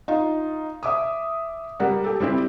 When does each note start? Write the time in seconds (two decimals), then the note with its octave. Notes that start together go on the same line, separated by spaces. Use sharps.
0.08 D#4 F4
0.83 E5 D6 D#6
1.80 G3 A#4 D5 F#5
2.04 G4 A4
2.20 G3 C4 E4 G4